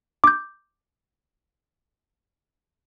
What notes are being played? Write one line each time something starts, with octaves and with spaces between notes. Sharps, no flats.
D6 G6